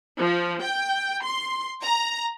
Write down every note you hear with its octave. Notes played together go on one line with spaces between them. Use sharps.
F3
G5
C6
A#5